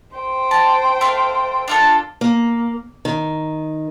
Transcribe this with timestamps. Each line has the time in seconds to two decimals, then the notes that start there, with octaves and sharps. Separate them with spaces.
0.16 C5 G5
0.51 A5
1.01 A3 F5
1.68 D4 F4 A4
2.21 A#3
3.05 D#3